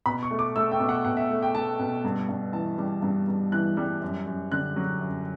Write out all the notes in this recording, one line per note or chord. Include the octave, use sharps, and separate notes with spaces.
B2 B5
C#6
A3
D6
A3 E6
G5
B2
F#5
B2 F#5
E5
A3
G5
A3 A5
B2
G2
G2
E3 A5
G3
G2
G2
E3 F#6
G3
F#2
F#2
D3 F#6
F#3
F#2